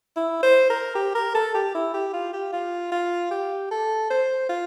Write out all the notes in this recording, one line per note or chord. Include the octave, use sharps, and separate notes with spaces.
E4
C5
A#4
G4
A#4
A4
G4
E4
G4
F4
G4
F4
F4
G4
A4
C5
F4